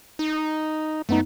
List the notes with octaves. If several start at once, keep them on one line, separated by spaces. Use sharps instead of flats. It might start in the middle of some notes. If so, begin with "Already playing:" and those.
D#4
F#2 A3 B3 D#4